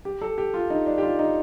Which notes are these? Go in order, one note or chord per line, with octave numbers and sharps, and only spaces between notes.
G4
A4
G4
F4
D#4
D4
G4
F4
D#4